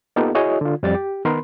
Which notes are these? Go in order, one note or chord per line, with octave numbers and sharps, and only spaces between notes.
A#3 B3 D#4 F4 G4 A4
E4 F#4 G#4 C#5 D#5
D3 F4
F2 G3 A6
G4
D#3 B3 A#4 B5 C6